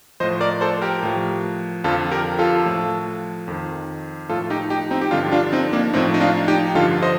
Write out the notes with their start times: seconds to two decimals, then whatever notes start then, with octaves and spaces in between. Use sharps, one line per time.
0.20 A2 F3 C5 D#5
0.40 A#4 D5
0.61 A4 C5
0.81 G4 A#4
1.03 A2 F3
1.84 F2 D3 F3 F4 A4
2.11 G4 A#4
2.39 F4 A4
2.66 A2 F3
3.48 F2 D#3
4.29 A2 F3 F4 A4
4.50 D#4 G4
4.70 D#4 G4
4.91 C4 D#4
5.01 G4
5.11 G2 D3 F3 D4 F4
5.31 D4 F4
5.52 C4 D#4
5.73 A#3 D4
5.93 A2 F3 C4 D#4
6.14 D#4
6.20 D4 F4
6.48 D#4 G4
6.75 G2 D3 F3 F4 A4
7.02 C5 D#5